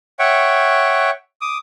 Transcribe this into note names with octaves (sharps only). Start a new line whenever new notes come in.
C#5 E5 F#5 G5 C#6
D6 D#6